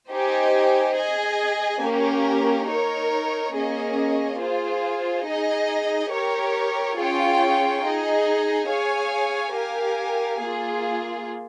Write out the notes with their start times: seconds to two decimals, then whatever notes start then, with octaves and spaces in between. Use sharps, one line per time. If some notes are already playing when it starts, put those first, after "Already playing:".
0.10 D#4 G4 C5 D#5 G#5
0.96 G#4 D#5 G#5
1.82 A#3 C#4 G4 A#4
2.68 D#4 A#4 C#5
3.54 A#3 C#4 G#4 D#5
4.40 F4 G#4 C5
5.25 D#4 G#4 D#5
6.12 G4 A#4 C#5
6.97 C#4 F4 G#4 C#5 G5
7.83 D#4 G#4 D#5
8.69 G#4 C#5 F5 G#5
9.55 G4 A#4 F5 G#5
10.41 A#3 F4 G#4